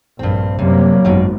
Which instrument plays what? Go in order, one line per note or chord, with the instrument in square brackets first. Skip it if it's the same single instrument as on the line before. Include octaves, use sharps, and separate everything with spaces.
[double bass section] A#1 [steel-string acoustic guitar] G2 C4
[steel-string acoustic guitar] F#2 [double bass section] C3 G3 A#3 [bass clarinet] F#3
[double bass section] G#1 [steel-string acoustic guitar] F#2 B2